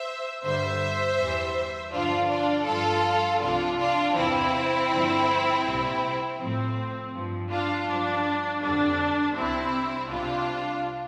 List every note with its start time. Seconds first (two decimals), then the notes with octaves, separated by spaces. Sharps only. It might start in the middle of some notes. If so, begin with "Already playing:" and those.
Already playing: C5 E5
0.44 G2 D3 G3 C5 E5
1.18 E2 E3 G3
1.93 G2 D3 F3 D4 F4
2.30 D4 F4
2.67 G2 F3 F4 A4
3.41 C2 C3 F3 D4 F4
3.79 D4 F4
4.16 E2 C3 E3 C4 E4
4.90 G2 D3 F3
5.64 C2 A#2 G3
6.38 A2 F3 C4
7.13 G2 F3
7.50 D4 F4
7.88 G2 F3 D4
8.62 F2 D3 G3 D4
9.36 C2 C3 G3 C4 E4
10.10 C2 C3 G3 D4 F4